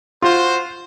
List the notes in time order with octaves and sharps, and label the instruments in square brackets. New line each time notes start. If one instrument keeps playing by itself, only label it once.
[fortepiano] F4 [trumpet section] F#4 C5